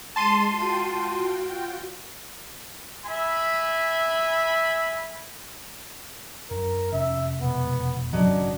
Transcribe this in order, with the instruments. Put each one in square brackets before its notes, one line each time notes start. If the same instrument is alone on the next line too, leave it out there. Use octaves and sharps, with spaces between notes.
[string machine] G#3 [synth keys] A5 C6 D#7
[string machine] F4 F#4 G5
[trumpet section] E5 G#5 B5
[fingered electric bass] F#2 [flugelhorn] A#4
[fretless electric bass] F1 [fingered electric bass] C#4 [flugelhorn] E5
[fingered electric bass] E1 B2 [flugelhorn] B3
[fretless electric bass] G#1 F#2 C#3 [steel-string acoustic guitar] F#3 D#5 [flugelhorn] D4